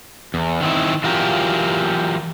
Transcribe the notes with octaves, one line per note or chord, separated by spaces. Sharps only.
E2
D#3 C4 E4
E3 F#3 F4 G4 A#4